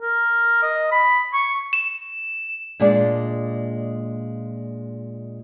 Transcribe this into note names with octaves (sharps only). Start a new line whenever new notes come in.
A#4
D#5
B5
C#6
E7
A#2 G#3 D4 D5